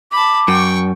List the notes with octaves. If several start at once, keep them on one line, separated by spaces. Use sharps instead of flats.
A5 B5 D6
F#2 G5 C#6